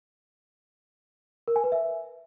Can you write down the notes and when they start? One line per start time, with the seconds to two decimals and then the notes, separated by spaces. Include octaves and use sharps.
1.48 A#4
1.56 G#5
1.64 B4
1.72 E5